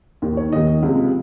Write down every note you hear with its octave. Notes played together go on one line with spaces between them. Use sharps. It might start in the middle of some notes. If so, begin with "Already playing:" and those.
D#2 D#3
C#5
D#2 D#3 D#5
C#2 C3 F3